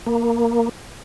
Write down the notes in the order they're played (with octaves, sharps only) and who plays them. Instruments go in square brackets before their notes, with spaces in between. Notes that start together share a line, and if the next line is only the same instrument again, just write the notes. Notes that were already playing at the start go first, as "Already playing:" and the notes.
[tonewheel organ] A#3